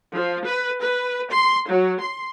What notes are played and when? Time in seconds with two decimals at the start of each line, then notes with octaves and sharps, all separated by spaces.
0.14 F3
0.45 B4
0.81 B4
1.29 C6
1.69 F#3
2.01 C6